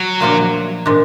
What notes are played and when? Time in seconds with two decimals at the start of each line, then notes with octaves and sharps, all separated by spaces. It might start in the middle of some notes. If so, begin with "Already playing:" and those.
Already playing: F#3
0.20 A#2 F3 A#3 D4
0.86 A#2 F3 G#3 D4